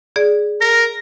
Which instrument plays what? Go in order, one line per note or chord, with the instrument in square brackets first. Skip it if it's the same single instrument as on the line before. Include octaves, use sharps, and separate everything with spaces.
[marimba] G#4 D5
[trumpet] A#4 [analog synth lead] A#6